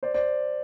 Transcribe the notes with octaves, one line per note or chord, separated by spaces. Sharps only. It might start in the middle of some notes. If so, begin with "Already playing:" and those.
C5 D5
C5 D5